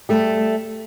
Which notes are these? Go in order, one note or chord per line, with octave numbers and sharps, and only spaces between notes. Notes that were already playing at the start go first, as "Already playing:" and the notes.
G3 A3